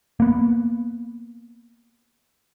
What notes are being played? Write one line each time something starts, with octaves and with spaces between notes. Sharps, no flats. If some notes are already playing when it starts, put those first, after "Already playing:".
A#3 B3